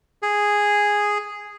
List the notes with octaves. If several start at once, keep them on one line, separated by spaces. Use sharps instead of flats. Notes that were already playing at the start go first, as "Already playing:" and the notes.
G#4